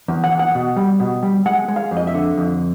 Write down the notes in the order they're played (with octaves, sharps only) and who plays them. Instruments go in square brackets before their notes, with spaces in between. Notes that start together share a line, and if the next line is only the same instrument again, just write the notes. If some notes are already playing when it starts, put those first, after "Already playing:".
[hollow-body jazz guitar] E2
F#5
E2
F#5
B2
G3
B2
G3
G#3 F#5
G#3
F5
F2
D#5
E5
D3
F2